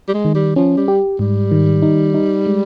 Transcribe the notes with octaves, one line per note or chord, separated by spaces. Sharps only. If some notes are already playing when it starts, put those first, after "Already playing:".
G3
G#3
D#3
G3
F3 C#4
G3
G4
G#2 G3
D#3
D#4
D#4
G#3